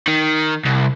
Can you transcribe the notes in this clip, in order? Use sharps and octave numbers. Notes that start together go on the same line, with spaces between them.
D#3
C2